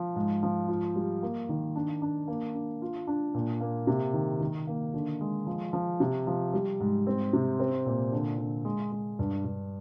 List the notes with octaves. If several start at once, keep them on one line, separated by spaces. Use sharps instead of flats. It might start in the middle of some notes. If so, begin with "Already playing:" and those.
Already playing: F3
G#2
F3
F4
G3
A#3
D#3
D4
D4
A#3
D4
F4
D4
A#2
A#3
C3
D#3
D#3
A#3
D3
G#3
F3
F3
C3
F3
G3
G#2
C4
C3
C4
A#2
D3
D3
G#3
G#3
G2
G2